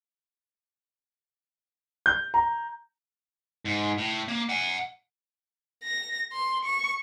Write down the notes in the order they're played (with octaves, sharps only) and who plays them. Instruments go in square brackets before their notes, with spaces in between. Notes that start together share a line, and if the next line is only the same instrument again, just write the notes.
[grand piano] G6
A#5
[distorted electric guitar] G#2
A2
A#3
F#5 G#5
[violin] A#6
C6
C#6